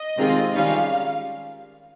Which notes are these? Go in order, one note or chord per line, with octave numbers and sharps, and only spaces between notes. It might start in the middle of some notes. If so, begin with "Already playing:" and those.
Already playing: D#5
C3 D#3 G#3 C4 F4
D#3 G3 C#4 F4 F5